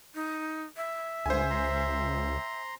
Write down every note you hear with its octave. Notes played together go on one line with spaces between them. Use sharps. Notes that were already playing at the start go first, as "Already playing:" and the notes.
D#4
E5
C#2 G2 D3 C5 G#5
A#5 C6